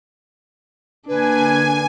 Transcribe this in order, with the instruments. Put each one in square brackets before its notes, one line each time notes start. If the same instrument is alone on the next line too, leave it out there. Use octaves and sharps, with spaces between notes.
[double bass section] D3 A#3 [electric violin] D4 [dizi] B4 [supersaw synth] G#5